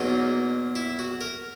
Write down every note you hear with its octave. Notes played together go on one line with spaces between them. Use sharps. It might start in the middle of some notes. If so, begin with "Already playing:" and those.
Already playing: E2 B2 F#3 A#3 D#4
E4
F#4
A#4